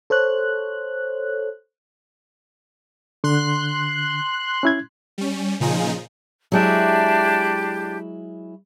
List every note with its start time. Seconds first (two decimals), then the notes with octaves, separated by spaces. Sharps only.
0.10 A4 C5 C#5 F#6
3.24 D3 C6 F#6
4.63 C#4 E4 G#6
5.18 G3 C#4
5.60 A#2 C#3 F3 D#4 F4 G#4
6.52 F#3 G#3 D4 E4 G4